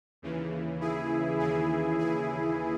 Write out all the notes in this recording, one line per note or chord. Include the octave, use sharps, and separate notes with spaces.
D#2 C#3 E3
E4 G#4
D#2 C#3 E3 E4 G#4
E4 G#4